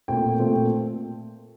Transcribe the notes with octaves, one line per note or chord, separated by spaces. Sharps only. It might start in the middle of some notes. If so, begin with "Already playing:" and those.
A#2 A3 C4 G5
A#2 A3 C4